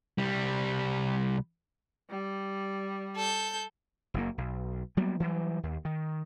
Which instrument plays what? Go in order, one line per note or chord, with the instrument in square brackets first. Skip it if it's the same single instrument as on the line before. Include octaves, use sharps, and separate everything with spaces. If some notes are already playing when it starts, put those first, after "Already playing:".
[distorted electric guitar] C2 G3
[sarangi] G3
[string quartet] A4 G6
[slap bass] F#1 F#2 A#3
B1
F#3 G3 A#3 B3
E3 F#3 G3
D#2
D#3